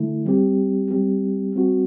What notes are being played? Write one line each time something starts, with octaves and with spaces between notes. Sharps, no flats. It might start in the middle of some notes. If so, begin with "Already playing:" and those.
Already playing: D3 A3 E4
G3 C4 G4
G3 C4 G4
G3 C4 F#4